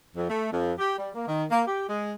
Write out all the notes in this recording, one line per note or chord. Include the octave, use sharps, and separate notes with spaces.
F2
A3
F2
G4
G3
A#3
D#3
A#3
G4
G#3